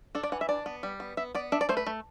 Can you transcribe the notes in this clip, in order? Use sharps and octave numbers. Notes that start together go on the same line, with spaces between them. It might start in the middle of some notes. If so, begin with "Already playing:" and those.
D4 A4
D5
E3 F#5
E5
D4 D5
B3
G3
B3
B3 E5
B3 D5
D4 E5
D5
A3 C5
B4
A3